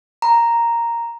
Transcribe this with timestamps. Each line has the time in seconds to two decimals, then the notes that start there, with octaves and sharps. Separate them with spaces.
0.22 A#5